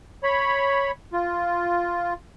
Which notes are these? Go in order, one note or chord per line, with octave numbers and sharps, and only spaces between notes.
C#5 B5
F4